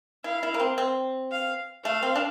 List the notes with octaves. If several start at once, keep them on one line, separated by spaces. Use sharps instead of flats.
E4 F5
E4
A#3
C4
C4
F5
A3 F5
C4
D4